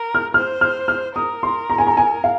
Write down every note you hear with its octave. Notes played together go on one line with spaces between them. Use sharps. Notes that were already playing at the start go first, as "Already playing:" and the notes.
Already playing: A#4
F6
C5 F6
F6
F6
A#4 D#6
C6
A#5
G#5
A#5
G#5
F5